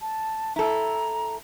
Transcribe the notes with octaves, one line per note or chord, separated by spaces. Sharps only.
A5
E4 A4 A#5